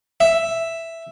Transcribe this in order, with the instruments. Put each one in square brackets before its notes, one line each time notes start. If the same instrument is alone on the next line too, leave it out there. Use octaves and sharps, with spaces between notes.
[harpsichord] E5